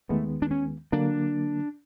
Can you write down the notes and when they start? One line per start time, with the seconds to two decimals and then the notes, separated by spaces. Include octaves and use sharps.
0.09 D#2 D#3 G#3 A3 B3
0.42 D4
0.51 C#4
0.92 D3 F#3 A#3 D4